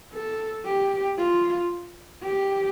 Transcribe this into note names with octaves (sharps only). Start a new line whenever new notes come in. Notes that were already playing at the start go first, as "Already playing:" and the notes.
A4
G4
F4
G4